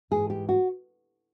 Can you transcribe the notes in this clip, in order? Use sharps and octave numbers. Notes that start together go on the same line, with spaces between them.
G#2 E3 G#3 G#4
G4
F#4